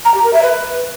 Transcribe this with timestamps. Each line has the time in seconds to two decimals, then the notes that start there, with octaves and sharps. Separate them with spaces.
0.05 A#5
0.14 G4
0.24 A#4
0.33 E5
0.43 B4